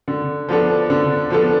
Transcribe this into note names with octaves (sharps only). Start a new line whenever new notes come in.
D3
F3 B3 D4 A4
D3
F3 B3 D4 A4